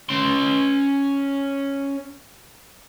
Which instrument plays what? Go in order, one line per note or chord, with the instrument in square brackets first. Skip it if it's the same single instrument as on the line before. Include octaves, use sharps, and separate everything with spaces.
[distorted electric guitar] C#4 C6